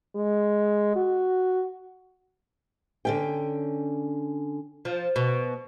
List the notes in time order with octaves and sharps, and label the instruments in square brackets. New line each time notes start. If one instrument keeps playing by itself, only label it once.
[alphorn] G#3
F#4
[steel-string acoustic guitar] D3 C#4 G5
[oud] F3
B2